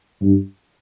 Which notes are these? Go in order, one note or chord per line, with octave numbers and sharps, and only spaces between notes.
G2